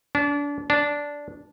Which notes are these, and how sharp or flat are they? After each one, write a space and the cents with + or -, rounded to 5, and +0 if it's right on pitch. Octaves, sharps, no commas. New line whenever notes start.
D4 -30
D4 -10